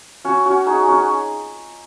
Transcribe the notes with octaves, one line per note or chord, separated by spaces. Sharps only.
C#4 F#4
C#4 F#4
D#4 G#4
C#4 F#4